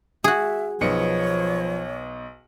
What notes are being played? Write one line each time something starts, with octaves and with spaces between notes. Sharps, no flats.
F#4 G#4 E5
B1 F3 B3 C#5 C#7